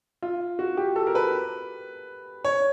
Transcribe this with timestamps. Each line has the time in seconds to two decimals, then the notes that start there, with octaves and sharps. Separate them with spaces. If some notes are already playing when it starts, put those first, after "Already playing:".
0.22 F4
0.59 F#4
0.77 G4
0.96 A4
1.07 A#4
1.15 B4
2.45 C#5